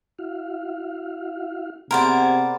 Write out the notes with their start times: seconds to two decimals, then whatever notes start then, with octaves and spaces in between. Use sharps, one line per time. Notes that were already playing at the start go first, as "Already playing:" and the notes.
0.19 E4 F#4 F5
1.91 C3 B3 G#4 A#4 C5 D5 G#5 G#6